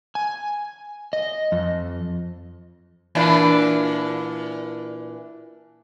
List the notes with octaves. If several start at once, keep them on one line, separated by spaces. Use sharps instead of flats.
G#5
D#5
F2
A#2 E3 D4